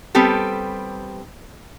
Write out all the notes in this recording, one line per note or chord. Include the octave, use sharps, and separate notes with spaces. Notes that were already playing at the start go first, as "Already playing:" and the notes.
G3 B3 C4 G4 A4